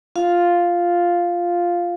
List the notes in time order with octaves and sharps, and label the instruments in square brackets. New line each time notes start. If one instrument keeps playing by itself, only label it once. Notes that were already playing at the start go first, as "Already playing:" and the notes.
[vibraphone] F4 F5